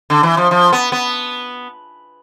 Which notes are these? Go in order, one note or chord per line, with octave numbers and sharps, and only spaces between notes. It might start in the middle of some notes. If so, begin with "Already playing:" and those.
D3
E3
F3
F3
B3
B3